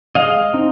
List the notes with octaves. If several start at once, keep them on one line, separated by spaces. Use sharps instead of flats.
G#3 D#5 F5
C4 D#4